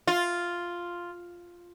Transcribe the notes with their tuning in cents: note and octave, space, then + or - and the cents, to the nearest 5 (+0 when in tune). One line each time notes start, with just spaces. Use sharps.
F4 +0